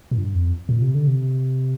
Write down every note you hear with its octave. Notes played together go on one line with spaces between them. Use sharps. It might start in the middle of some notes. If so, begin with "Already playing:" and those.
A#2
G2
F2
A#2
C3
D3
C3